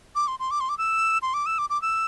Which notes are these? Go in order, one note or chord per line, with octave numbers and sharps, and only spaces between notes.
D6
C6
C6
D6
C6
D6
E6
C6
D6
E6
D6
D6
E6